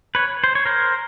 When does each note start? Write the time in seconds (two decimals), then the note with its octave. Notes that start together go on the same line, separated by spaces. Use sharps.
0.15 B4 C#5
0.44 C5
0.55 C#5
0.66 A#4 C5